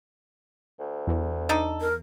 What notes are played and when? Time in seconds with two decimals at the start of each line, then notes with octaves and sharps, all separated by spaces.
0.79 D2
1.07 E2
1.49 D4 D#4 A4
1.81 A#4